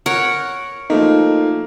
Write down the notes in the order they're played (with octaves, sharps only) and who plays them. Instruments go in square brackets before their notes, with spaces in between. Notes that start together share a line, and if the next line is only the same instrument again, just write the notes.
[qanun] A#4 C#5 F#5
[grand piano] F3 A3 A#3 [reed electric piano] D#4